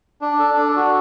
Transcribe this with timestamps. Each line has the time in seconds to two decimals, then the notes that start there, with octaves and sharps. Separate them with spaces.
0.21 D4
0.39 A4
0.57 D4
0.76 F#4